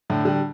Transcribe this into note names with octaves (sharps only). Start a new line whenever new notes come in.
A2 D3
D3 G3